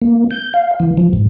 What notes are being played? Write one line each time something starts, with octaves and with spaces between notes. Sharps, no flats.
A#3
G6
F5
E3
F3
G#2